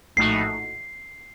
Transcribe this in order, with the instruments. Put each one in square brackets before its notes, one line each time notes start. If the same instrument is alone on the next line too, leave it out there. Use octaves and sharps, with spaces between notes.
[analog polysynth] A#1 A2 A3 D#4 F#4 [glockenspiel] C7